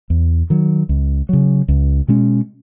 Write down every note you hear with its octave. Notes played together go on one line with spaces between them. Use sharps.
E2
D#3 F#3
C#2
C#3 F#3
C#2
B2 G#3 C#4